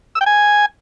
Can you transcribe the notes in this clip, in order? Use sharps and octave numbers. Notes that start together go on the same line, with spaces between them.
E6
G5
G#5